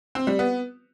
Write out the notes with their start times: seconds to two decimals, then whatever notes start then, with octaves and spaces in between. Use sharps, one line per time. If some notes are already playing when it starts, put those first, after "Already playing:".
0.15 C4
0.27 G3
0.39 B3